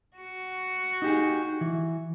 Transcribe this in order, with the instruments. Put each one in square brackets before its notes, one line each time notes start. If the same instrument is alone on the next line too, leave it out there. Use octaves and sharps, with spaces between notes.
[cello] F#4
[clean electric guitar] D#4 G4 G#4
E3